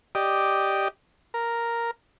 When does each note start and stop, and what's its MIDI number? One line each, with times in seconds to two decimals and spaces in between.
0.15 0.88 67
0.15 0.88 74
0.15 0.88 75
1.34 1.91 70